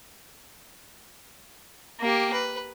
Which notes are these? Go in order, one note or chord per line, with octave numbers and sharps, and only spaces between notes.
A#3 G4
B4